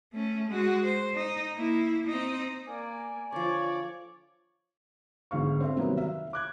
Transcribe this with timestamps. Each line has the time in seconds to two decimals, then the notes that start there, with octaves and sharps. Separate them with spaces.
0.13 A3 C#4
0.49 G#3 F#4
0.86 C5
1.15 D#4
1.55 A#3 E4
2.07 C4 D#4
2.66 A#3 D5 G#5
3.32 D3 F3 C#5 D5
5.31 G1 G#2 F5 C#6
5.61 C4 A4 E5
5.77 C3 D#3 F#3 G3 A#3 B3
5.97 E5 F5
6.33 D6 F#6 G#6